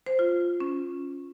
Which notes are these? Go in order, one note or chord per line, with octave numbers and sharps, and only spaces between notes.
C5
F4
C#4